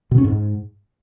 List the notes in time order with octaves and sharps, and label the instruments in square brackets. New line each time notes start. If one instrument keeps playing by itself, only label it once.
[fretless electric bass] B2
C#4
G#2